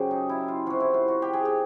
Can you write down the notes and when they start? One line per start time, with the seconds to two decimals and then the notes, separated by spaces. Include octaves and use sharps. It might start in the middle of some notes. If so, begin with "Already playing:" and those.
Already playing: F#2 C#3 F#3 G4 C5
0.11 D#4
0.29 E4
0.48 F4
0.66 C3 F3 F#4
0.80 E4
0.94 F4
1.08 F#4
1.22 G4
1.33 G#4
1.45 G4